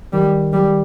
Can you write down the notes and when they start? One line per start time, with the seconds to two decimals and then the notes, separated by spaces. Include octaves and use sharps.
0.13 D#3 G3
0.53 G3